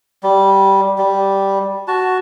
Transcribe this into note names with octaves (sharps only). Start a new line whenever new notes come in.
G3
G3
F#4 A5